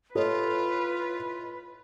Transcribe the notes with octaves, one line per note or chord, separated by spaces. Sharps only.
A2 F4 A4 B4 C#5 D#5